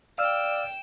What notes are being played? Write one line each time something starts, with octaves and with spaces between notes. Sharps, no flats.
D5 F5 G5 E6 F6 E7